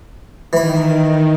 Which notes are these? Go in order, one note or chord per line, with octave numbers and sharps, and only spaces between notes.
D#3 E3 B5